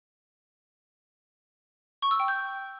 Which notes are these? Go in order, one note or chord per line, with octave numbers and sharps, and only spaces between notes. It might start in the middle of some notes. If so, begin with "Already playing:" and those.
C#6
E6
G5
G6